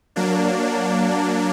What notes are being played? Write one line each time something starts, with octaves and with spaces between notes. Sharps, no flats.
F#3 A#3 D4